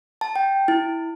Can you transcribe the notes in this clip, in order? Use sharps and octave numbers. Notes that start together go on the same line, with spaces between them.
A5
G5
E4